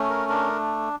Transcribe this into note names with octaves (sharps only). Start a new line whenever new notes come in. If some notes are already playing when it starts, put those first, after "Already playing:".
Already playing: A3 C#4
A#4
D4 A#4